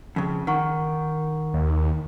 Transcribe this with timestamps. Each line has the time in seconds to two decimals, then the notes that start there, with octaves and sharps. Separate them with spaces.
0.16 F2 C#3
0.47 D#3 F#5 A#5 C#6
1.54 D#2